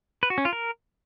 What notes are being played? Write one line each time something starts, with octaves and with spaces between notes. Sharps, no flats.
B4
F#4
C#4
F4
A#4